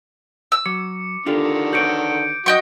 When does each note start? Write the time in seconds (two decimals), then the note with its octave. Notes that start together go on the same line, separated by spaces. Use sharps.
0.52 E6
0.66 F#3 D6 C#7
1.26 D3 D#3 D4 F4 G4
1.73 F#4 B4 C#5 G6 C#7 D7
2.46 F#2 F#4 D#5 G5 C#6